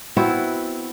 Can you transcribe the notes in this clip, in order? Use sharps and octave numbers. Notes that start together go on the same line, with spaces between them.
B3 C4 E4 F#4